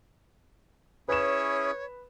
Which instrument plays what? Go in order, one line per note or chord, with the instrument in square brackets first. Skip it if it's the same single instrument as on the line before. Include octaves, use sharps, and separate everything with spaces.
[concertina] C#4 E4 G#4 [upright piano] B4 E7 [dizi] C#5